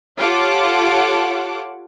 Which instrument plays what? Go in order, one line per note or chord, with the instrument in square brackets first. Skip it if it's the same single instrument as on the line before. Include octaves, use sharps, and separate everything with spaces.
[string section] F4 G4 A4 C#5 F#5 D6